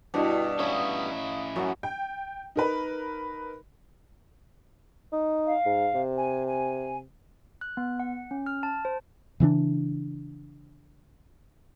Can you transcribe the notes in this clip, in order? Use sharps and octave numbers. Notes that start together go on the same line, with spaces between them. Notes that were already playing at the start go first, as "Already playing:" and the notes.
G2 B2 D4 E4 F#4 D#5
C#4 E4 C#5 F5 D#6
F#2 F#4 E5 F#5
G5
D#4 A#4 B4
D#4
F5
G#2
C3
G#5
G#5
F#6
B3
F#5
C#4
F6
A5
C5
C#3 E3 C4 D4